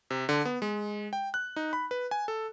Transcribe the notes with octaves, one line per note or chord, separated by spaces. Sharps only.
C3
D3
B3
G#3
G5
F#6
D#4
B5
B4
G#5
A4